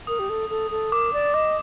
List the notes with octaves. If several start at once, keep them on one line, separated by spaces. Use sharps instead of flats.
A#4 D#6
G4
A4
A4
A4
A#4 D6
D5
D#5 D6